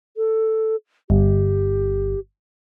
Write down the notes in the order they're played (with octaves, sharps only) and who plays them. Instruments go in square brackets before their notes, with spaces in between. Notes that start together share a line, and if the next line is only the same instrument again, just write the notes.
[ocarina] A4
[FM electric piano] G1 [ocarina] G4